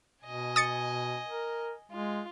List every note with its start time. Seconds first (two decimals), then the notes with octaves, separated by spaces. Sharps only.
0.25 B2 D#5 G#5
0.56 D#6 A6 C#7
1.28 A#4
1.92 G#3 F4